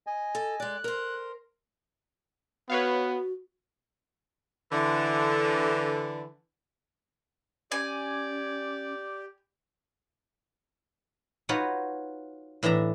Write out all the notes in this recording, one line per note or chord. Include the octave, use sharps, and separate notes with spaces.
D#5 G#5
A4
G#3 D5 F#6
A#4 C5
B3 F#4 B4 C#5 F5
D3 E3
C#4 G4 D5 G#5
D#4 F4 F#4 B4 C#5
A2 E3 D4 E5 A#5